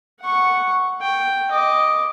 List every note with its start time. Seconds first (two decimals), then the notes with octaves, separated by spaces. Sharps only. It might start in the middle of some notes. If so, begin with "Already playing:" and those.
0.21 F#5 C#6
1.01 G5
1.51 D#5 D6